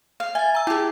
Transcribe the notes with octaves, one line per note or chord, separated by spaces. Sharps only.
F5
E5 G#5 A6
A#5 E6
E4 G4 G#4